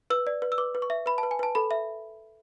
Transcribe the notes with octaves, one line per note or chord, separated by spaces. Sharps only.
B4 E6
D5
B4
E6
B4 D6
B4
C#6
E5
B4 B5
A5
B4
G#5
B4 A5
A4 B5
E5